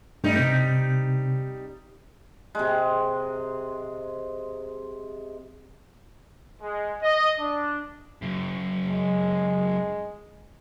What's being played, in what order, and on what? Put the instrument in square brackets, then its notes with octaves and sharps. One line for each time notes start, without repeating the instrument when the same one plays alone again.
[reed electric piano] G2 A3 [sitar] G3 D#4
[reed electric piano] C3 C4
[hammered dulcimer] C3 G#3
[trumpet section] G#3
D#5
D4
[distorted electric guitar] F#2 C#3
[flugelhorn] G#3